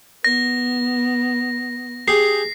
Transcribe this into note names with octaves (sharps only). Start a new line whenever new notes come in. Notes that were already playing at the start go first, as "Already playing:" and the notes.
B3 A#6
G4 G#4 C7